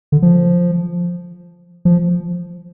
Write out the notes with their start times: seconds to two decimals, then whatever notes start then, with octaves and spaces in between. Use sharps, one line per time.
0.12 D3
0.22 F3
1.85 F3